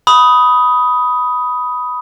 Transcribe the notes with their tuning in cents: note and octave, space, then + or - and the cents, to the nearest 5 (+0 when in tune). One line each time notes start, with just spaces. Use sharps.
B5 +0 D#6 +10